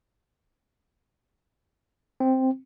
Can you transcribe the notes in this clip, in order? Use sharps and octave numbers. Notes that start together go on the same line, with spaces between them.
C4